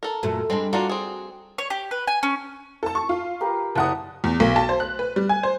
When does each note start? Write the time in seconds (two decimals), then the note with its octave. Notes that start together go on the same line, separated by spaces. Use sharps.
0.03 A4 A#4
0.23 F#2 A#2 A3
0.50 G3 G#3 C4 D4
0.73 A#3 D4 F4 F#4
0.89 C4 G#4
1.58 C#5
1.70 G4
1.91 B4
2.07 G#5
2.23 C#4
2.83 A4 A5
2.95 C#6
3.09 F4
3.41 G4 A#4 B4
3.75 F#1 D5 F#5 A5 D#6
4.24 E2
4.40 B1
4.56 A5
4.69 C5
4.80 F#6
4.99 B4
5.16 G3
5.29 G#5
5.43 C5